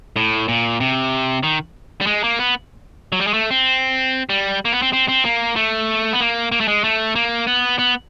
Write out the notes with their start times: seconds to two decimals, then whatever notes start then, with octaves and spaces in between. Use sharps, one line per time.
0.16 A2
0.48 A#2
0.80 C3
1.43 D#3
2.01 G3
2.07 G#3
2.24 A#3
2.39 B3
3.12 F#3
3.20 G3
3.27 G#3
3.34 A3
3.51 C4
4.29 G3
4.65 A#3
4.72 B3
4.82 C4
4.93 C4
5.08 C4
5.25 A#3
5.56 A3
6.13 B3
6.20 A#3
6.52 A#3
6.60 A3
6.68 G#3
6.84 A3
7.15 A#3
7.47 B3
7.79 B3